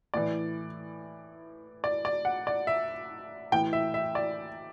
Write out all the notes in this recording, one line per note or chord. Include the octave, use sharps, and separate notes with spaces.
A2 E3 D5
D5
D5
F#5
D5
E5
A2 E3 G5
E5
E5
D5